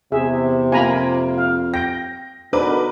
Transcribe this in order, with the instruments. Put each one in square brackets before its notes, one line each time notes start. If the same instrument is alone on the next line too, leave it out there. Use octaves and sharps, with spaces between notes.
[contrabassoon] E2 [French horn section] C3 [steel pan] G#4 E5
[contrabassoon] F2 [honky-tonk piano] A#3 F4 [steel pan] G#5 A#5 B5
[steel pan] F5
[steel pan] G5 [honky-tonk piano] A#6
[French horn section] B2 D3 D#4 [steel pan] D4 [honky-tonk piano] A#4 B4 D6